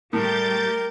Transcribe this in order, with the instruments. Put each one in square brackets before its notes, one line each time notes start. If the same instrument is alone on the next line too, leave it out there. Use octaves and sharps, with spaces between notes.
[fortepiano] A2 [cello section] G3 A3 G4 [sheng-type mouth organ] A#4 [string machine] G6 A6